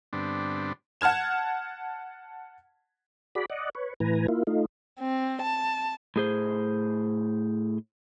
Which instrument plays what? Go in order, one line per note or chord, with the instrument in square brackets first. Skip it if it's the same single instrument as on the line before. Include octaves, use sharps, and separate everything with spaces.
[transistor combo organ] G2 D3 B3 C4 D4
[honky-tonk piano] F#5 A5 F6 G#6 E7
[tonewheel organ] F#4 G#4 D5 B5
D5 D#5 F#5
B4 C#5
A2 E3 B4 G#5 A#5
A#3 E4 F4
A3 D#4 F4
[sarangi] C4
A5
[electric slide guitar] A2 G#4 C5